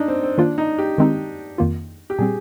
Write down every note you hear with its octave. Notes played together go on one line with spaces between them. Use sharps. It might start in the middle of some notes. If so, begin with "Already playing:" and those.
Already playing: D4 D#4
C4
C4
D#3 A#3 D4 F4
D#4
G4
D#3 G#3 C4 D#4
F2 D#3 A#3 F4
G4
A#2 G3 C4 G#4